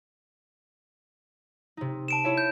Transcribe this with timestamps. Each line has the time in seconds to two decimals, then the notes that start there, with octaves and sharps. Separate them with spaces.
1.77 C3 D#4
2.08 A5 D7 E7
2.24 E4 C#5 E5
2.38 G6